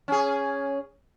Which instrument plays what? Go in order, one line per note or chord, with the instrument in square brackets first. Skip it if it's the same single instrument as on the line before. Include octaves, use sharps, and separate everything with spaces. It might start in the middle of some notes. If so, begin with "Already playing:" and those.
[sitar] C#4 G#4